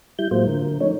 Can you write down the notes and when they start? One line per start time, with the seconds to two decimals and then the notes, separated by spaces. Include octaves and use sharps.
0.19 G3 E4 G6
0.31 A2 F#3 G#3 A#3 F4 C5
0.47 D3 A#4
0.80 F3 A3 C#4 D#4 C#5